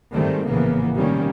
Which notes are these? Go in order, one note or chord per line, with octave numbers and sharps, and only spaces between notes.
G#2 D#3 G3 A3 C4
A#1 A2 C#3 E3 A#3 B3
C3 D#3 G3 A#3 C#4